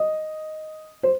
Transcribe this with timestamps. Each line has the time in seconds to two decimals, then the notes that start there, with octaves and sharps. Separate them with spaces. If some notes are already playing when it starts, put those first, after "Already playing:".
Already playing: D#5
1.03 C5